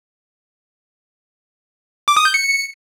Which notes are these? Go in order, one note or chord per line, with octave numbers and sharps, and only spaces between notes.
D6
D#6
G6
C#7